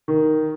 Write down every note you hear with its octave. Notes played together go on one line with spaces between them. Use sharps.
D#3